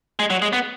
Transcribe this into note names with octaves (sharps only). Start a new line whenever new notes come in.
G#3
F#3
G#3
B3